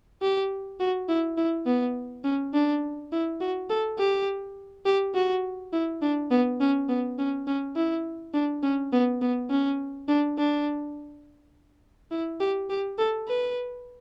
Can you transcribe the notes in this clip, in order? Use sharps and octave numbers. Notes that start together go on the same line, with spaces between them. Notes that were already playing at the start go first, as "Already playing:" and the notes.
G4
F#4
E4
E4
B3
C#4
D4
E4
F#4
A4
G4
G4
F#4
E4
D4
B3
C#4
B3
C#4
C#4
E4
D4
C#4
B3
B3
C#4
D4
D4
E4
G4
G4
A4
B4